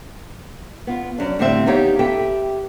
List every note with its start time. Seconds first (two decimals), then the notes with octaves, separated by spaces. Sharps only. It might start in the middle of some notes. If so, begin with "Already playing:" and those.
0.87 B3 F4
1.18 F#2 D4
1.39 A2 D3 G3 C4 E5 F5
1.66 B3 D#4 G4 C#5 F5
1.99 G4 A4 B4 E5 G5